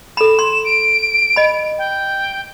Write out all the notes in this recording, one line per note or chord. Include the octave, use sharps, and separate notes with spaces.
A4 B5 E7
C6
D7
D#5 B5
G5